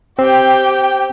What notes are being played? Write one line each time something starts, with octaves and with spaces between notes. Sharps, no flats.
C4 G4 G5